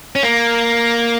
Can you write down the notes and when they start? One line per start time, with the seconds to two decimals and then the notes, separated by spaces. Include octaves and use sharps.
0.15 C#4
0.23 A#3